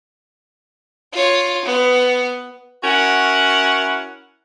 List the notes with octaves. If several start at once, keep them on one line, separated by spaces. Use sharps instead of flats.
F4 C#5
B3
C#4 E4 F#4 A#4 F#5